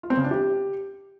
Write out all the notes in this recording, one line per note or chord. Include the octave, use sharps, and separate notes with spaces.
F4
C4
C#3
D4
G4